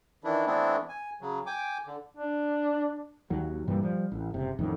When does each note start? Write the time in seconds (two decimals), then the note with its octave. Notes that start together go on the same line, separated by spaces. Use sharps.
0.24 D#3 E3 D4 E4
0.47 E3 A3 B3 C4 D4 E4
0.89 G#5
1.21 C#3 F#3
1.46 G5 G#5 D6
1.87 D3
2.17 D4
3.30 D#2 F#3
3.67 G2 A#2 E3 G3
3.83 F3 G3
4.12 A1
4.34 F#1 C3
4.59 A1 F2 A2 D#3